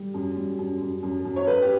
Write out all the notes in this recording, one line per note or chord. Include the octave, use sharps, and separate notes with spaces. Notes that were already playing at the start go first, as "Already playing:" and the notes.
Already playing: G3
F#2
G3
F#2
F#2
F#2
F#2
C#5
F#2 B4
G4